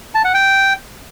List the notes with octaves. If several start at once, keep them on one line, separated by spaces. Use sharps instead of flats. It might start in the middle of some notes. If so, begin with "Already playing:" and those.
A5
F#5
G5